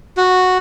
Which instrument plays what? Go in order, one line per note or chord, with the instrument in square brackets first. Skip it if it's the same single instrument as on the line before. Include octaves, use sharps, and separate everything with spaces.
[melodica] F#4